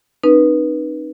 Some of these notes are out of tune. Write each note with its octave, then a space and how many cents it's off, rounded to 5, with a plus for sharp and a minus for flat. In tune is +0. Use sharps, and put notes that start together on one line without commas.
C4 +35 D#4 -20 B4 -25